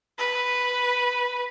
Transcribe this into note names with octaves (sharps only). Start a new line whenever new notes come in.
B4